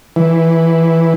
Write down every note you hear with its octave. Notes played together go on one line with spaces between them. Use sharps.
E3